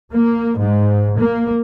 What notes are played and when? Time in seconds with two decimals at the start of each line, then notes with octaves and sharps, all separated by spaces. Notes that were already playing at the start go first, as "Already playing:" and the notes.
0.13 A#3
0.58 G#2
1.18 A#3